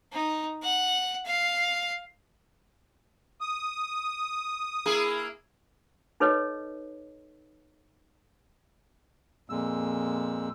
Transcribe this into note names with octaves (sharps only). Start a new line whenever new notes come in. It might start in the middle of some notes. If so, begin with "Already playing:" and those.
D#4
F#5
F5
D#6
A#3 E4 G#4
D#4 A4 B4 C#5 D#5
F2 A#2 G#3 E6